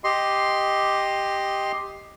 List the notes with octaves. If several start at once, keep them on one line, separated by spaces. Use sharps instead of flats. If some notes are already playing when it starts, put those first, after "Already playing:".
G4 D#5 C6